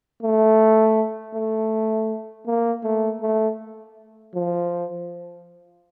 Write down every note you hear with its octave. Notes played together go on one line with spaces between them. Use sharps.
A3
A3
A#3
A3
A3
F3